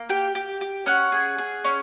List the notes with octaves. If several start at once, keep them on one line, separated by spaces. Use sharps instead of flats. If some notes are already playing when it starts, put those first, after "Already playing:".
Already playing: A#3
G4 G5
G4
G4
C#4 F#5
G#4
G#4
C#4